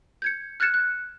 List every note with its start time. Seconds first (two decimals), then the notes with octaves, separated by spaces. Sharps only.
0.22 G6 G#6 C#7
0.60 F6 F#6 G#6 A6 C#7 E7
0.74 F#6